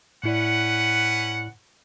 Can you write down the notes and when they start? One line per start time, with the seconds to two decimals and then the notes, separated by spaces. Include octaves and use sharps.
0.24 A2 C#4 E4 B4 D5 F#5